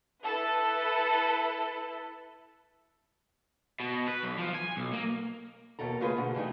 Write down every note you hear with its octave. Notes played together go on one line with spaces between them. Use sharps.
E4 A4 B4
B2
B4
B1
F3
G#5
B1
A#3
D#2 B2 A4 A#5
C#3 A3 A#3 F4 G#4 B4
B2 D3
G2 E3 A3 D#4